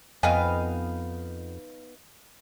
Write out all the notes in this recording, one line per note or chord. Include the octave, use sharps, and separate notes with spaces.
F2 B3 D#4 D#5 F5 G5 G#5